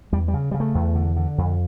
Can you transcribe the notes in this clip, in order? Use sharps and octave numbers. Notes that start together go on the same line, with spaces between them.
E2 G3
G3
C#3
C#3 G3
A3
E2
D3
D3
F2